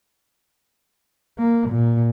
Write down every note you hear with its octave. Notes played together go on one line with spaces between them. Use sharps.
A#3
A#2